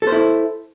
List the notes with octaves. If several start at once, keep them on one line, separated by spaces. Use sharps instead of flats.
E4 A4 C5